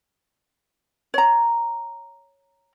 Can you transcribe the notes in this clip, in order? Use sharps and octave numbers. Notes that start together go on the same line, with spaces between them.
C#5 A#5